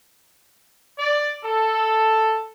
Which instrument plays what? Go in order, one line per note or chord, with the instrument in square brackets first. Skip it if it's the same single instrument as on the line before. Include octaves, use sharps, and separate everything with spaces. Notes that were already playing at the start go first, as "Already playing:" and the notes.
[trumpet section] D5
A4